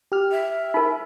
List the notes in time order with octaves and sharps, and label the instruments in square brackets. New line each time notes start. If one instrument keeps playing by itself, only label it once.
[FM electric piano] G4 F6
[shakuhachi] E5
[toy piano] D#4 A#4 [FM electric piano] B5